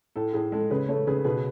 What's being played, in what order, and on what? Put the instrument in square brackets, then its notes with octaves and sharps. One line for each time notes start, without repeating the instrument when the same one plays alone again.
[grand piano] A2 A4
A2 G#4
G#3 A4
C#3 G#4 B4
A3 A4 C#5
C#3 G#4 B4
B2 G#4 B4